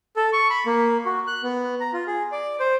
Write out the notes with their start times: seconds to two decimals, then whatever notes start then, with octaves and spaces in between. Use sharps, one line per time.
0.16 A4
0.33 C#6
0.50 B5
0.66 A#3
1.06 F#4
1.27 F#6
1.43 B3
1.80 A#5
1.93 F4
2.07 G#4
2.32 D5
2.60 C5